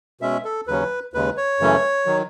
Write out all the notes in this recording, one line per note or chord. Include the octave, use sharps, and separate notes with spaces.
B2 G#3 C#4 E5
A4
D#2 C#3 F#3 C#4 B4
D#2 C#3 G#3 B4
C#5
F#2 C#3 E3 A3 C#4
D#3 F#3